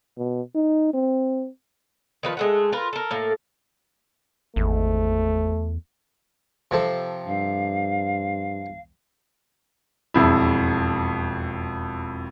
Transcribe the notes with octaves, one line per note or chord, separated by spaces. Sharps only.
B2
D#4
C4
D#3 F3 B4
G#3 A3 F#5
F4 A#4 B4
A4 A#4
A2 A#3 A4
G#1 E2 A3
C3 F3 A4
G2 F5
E1 F2 E4